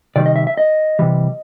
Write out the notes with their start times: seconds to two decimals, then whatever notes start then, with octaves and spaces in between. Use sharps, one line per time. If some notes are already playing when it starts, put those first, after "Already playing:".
0.16 C3 D#3 G3 D5
0.26 D#5
0.36 E5
0.47 E5
0.57 D#5
0.99 C3 E3 G3